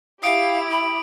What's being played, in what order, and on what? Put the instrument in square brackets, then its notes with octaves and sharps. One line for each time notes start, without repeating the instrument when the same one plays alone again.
[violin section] E4 G4 [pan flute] F5 [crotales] D#6 D7
[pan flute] B5